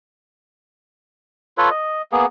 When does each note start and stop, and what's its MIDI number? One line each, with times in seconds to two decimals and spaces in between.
1.58 1.70 65
1.58 1.70 69
1.58 1.70 71
1.58 1.70 73
1.71 2.02 75
2.12 2.26 58
2.12 2.26 59
2.12 2.26 68